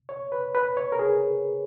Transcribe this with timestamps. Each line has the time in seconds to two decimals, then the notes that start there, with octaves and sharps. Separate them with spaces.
0.09 C#5
0.32 B4
0.55 B4
0.77 C#5
0.92 A#4
0.99 G#4